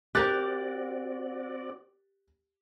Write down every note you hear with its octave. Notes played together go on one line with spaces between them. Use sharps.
C4 F#4 G4 A#4 D5 F#6 A6